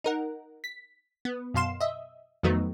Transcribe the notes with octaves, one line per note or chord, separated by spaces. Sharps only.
D#4 A#4 F#5
B6
B3
F#2 B2 F5 C6 E7
D#5 E5
F2 D#3 F#3 A3 B3 D#4